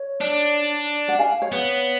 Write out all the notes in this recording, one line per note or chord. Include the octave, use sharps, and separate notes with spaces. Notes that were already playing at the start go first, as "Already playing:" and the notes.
Already playing: C#5
D4
D5 F#5
F5 G#5
C#5 F5
B3